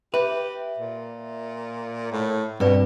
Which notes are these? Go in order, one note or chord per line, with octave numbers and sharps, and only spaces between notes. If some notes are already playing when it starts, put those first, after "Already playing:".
G4 B4 E5
A#2
A2
G2 B2 C4 B4 D5